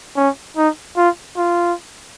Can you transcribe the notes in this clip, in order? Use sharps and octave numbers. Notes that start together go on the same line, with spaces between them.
C#4
D#4
F4
F4